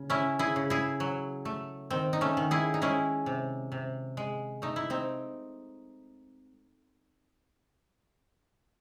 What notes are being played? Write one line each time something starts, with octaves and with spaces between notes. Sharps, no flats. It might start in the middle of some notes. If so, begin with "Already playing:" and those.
Already playing: C#3
A3 C#4 E4
E4 G#4
C#3
E4 G#4
F#3
A3
D#3 C4
D#4
A3 C#4
D#3
E4 G#4
D#4
G#3 C#4 E4
C3
C3
G#3
A3 D#4
E4
C4 D#4